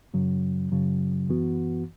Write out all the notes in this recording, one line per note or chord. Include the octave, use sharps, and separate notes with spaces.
F#2 C#3 F#3
F#2 C#3 F#3
F#2 E3 B3 F#4